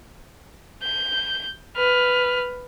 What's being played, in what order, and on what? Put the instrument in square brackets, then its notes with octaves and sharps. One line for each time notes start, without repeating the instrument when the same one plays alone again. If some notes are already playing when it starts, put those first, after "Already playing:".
[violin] G6
B4 F6